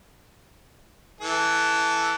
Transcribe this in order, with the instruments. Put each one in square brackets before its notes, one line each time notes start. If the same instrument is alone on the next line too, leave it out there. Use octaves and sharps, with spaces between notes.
[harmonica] E3 A4